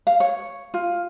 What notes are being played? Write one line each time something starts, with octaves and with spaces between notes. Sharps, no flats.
F5
C#5
F4